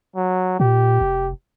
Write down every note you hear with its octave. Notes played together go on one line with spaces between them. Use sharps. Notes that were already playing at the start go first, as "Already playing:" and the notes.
F#3
A#2 G4
F1